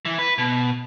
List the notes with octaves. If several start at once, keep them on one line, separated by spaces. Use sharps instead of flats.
E3
B4
B2